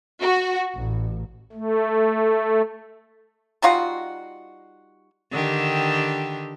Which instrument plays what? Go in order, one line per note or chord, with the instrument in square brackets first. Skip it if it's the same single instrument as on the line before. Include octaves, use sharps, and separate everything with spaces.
[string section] F#4
A1
[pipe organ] A3
[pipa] G3 D#4 F4 F#4
[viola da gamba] D3 D#3 G4